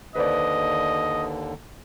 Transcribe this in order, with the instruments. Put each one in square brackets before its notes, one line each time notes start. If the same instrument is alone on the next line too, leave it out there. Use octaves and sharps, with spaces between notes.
[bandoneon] D#2 D3 [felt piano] B4 C5 D5 [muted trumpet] D#5